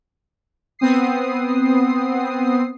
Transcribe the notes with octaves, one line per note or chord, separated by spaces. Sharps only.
B3 C4 D#6 C7